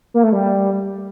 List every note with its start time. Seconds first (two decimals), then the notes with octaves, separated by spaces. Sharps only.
0.14 A#3
0.23 A3
0.33 G3